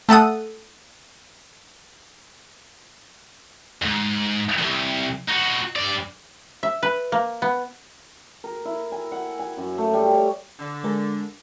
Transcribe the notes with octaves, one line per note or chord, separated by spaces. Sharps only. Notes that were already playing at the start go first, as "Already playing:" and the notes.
A3 A4 F#5 D#6
F2 G#2
C2 F2
D#4 F#4
G2 D5
E5
B4
A#3
B3
A#4
E4
G#5
F#5
G#5
F#2
A3
G3
C#5
D3
G#3 G#4 A#4